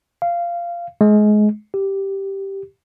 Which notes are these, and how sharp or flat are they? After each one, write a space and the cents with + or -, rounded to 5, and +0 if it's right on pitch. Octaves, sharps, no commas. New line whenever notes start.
F5 -15
G#3 +25
G4 -5